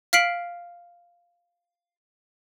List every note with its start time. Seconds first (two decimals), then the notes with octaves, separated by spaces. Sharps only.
0.13 F5 F6 B6 C7 D7 F#7